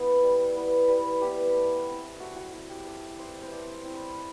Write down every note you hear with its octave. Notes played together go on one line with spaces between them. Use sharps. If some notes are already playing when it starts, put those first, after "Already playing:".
Already playing: B3 E4
G3
B3 E4
G3 B4
B3 E4 G4
A3
C4 E4
A3 F#4
F#4
C4 E4 F#4
G4
A3 D5
C4 E4 C5
C5
A3 D5
E5
C4 E4
B5